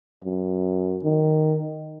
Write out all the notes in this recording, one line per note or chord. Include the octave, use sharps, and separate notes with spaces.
F#2
D#3